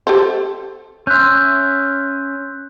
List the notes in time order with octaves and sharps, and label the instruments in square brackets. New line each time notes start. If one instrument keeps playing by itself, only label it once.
[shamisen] G4 A4 C5
[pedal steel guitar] C#4 E5 [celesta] C6 F#6 G6